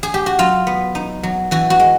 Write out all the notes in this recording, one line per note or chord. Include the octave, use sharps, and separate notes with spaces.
G#4
G4
F#4
F#3 F4
B3
D#4
F#3
E3 F#4
F#4
G#3